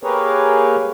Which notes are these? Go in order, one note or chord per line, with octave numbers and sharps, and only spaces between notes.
A#3 G4 G#4 A#4 B4 C#5